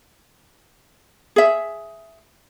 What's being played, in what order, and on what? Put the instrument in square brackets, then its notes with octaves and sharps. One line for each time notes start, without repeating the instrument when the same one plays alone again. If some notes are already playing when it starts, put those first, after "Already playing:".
[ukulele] G#4 E5